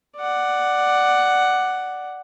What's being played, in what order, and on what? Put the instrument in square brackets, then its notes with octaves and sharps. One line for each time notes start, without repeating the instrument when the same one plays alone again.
[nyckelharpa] D5 F#5